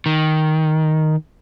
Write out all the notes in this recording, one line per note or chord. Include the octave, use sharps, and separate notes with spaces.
D#3